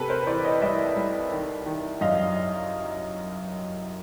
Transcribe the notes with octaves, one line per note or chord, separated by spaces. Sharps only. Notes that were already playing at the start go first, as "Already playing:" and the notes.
Already playing: C3 A4 B4
A#4 C5
E3 C5 D5
C#5 D#5
C2 D5 E5
C2
D#3
D#3
F#2 D#5 F5